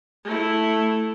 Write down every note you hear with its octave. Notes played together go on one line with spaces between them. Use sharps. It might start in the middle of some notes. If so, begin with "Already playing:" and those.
A3 E4